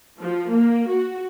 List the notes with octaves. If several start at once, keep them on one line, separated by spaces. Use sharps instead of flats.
F3
A#3
F#4